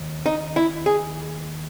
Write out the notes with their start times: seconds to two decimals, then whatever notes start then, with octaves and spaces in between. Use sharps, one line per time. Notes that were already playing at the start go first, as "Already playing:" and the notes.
Already playing: D#2
0.26 D#4
0.56 E4
0.86 G#4